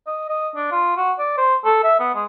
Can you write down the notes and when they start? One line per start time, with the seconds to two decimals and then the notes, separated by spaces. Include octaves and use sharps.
0.07 D#5
0.29 D#5
0.56 D4
0.72 F4
0.97 F#4
1.19 D5
1.38 C5
1.65 A4
1.84 E5
2.00 B3
2.14 G#3